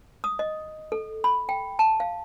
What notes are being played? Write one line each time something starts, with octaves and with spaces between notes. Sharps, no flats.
D#6
D#5
A4
B5
G5
A5
F5